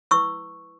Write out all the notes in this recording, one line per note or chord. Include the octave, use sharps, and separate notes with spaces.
E4 B4 C#6 E6